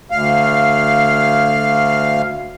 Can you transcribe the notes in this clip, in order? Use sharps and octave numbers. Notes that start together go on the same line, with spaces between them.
D2 F5